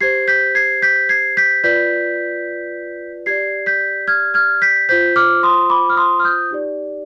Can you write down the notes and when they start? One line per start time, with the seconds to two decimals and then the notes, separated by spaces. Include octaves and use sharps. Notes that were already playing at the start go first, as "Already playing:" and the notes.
0.01 G4 C5 G#6 C7
0.28 G6 B6
0.55 G#6 C7
0.82 G6 B6
1.09 G#6 C7
1.37 G6 B6
1.64 F4 B4 D5 G6 B6
3.26 G4 D5 G#6 C7
3.66 G6 B6
4.08 F6 G#6
4.34 F6 G#6
4.62 G6 B6
4.89 F4 C5 G6 B6
5.16 D6 F6
5.43 C6 D#6
5.70 B5 D6
5.89 F6
5.96 C6 D#6
6.19 F6
6.24 D#6 G6
6.51 D#4 G4 D5